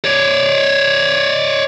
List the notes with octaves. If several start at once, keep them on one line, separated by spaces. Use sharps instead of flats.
C#5 D5